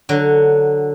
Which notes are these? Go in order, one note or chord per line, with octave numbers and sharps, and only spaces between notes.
D3 F#3